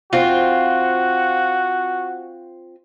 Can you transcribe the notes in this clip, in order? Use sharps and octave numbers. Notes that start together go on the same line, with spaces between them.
C4 F4 F#4